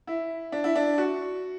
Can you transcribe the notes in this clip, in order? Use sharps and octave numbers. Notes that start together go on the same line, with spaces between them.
E4
D4
E4
D4
F#4